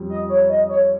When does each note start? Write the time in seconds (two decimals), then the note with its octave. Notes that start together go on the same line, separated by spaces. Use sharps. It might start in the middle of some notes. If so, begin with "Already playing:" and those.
Already playing: F2 G3 C#4
0.09 D#5
0.29 C#5
0.49 D#5
0.69 C#5